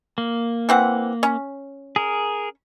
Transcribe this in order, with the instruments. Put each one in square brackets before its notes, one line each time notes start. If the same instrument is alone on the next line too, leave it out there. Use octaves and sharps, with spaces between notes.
[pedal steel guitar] A#3
[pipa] E3 C4 F#5
C#4
[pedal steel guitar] G#4 A#4